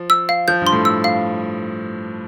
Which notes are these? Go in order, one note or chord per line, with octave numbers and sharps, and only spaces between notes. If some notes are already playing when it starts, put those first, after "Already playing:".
Already playing: F3
E6
F5
F3 G6
G2
C6
A2
E6
F5